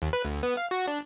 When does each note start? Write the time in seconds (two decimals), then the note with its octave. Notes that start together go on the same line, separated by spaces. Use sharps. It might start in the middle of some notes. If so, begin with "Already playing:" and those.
0.02 D#2
0.13 B4
0.25 D2
0.43 B3
0.57 F5
0.71 F#4
0.87 D4